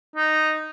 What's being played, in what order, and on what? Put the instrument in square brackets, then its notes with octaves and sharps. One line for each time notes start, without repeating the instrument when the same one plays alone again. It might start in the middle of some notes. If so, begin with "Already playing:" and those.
[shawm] D#4